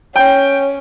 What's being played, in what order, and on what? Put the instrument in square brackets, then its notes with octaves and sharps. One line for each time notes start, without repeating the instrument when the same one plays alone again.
[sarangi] C#4 [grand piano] G5